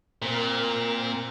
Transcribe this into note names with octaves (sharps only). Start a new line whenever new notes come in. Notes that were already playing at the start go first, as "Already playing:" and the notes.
A#2 C4 A#4